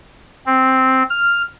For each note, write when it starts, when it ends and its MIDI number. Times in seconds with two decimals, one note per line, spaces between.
0.46 1.03 60
1.10 1.42 89